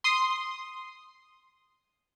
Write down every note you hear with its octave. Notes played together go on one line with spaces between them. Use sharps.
C6 D#6